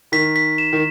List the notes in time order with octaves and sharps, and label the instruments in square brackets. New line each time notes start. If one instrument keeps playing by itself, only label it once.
[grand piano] D#3 [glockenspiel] B6
[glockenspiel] B6
E7
[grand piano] D#3